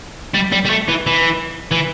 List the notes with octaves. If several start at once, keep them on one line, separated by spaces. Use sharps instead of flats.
G3
G3
G3
A3
E3
E3
E3